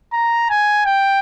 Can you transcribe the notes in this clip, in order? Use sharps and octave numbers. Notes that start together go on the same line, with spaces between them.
A#5
G#5
G5